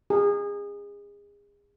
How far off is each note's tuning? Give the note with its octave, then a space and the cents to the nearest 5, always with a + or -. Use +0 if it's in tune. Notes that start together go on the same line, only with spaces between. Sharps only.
G#4 -30